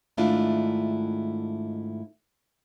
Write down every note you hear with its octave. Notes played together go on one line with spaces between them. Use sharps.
G#2 D#3 A3 D4 E4 F4